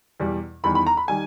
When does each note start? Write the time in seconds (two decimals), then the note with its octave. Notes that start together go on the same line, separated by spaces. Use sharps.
0.20 E2 B2 G3
0.64 E2 D#3 G3 B5
0.75 B5
0.87 A#5
0.97 B5
1.08 D#3 G3 G#5